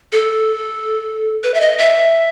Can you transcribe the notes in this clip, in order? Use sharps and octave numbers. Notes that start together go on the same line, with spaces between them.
A4
B4
E5
D#5
E5